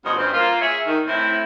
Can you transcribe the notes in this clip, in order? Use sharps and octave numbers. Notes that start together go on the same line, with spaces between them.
D2 G2 F3 B3 C#4 D#5
G2 C4 C#4
A#3 F4
G#4 C#5 E5
D#3
A2 C4 E4